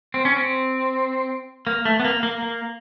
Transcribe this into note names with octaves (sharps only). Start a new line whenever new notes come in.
C4
C#4
C4
A#3
A3
B3
A#3
A#3
A#3